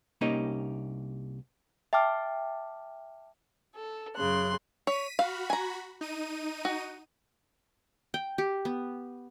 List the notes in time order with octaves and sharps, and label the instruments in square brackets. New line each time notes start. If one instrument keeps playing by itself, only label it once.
[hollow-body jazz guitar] C2 A#3 C#4 D#4 G4 D#5
[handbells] E5 G5 A5 D6 F6
[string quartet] A4
F#2 C#3 C6 F#6
[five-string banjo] C#5 [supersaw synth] B6 D#7
[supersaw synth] F#4 B5 [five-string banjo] F5
[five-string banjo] G#5 A#5
[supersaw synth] D#4 D#7
[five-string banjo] F#4
[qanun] G5
G4
B3